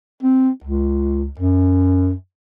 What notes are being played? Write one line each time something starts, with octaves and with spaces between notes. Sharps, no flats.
C4
C#2
F#2